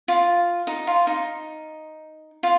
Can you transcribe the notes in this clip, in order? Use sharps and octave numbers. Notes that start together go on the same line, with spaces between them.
F4
D#4
F4
D#4
F4